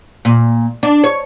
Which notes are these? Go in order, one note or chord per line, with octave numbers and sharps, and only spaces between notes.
A#2
D4
C#5